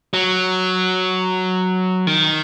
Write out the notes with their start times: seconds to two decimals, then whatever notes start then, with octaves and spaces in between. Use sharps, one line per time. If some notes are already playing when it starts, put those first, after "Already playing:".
0.14 F#3
2.07 D#3